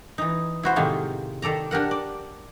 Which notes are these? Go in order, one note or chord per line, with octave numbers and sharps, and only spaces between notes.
E3 D#4
E4 F#4 C5
A2 C3 D#3 G#3 A#3 F4
D#3 A4 D5 A#5
D4 G4 A#4 F#5
D5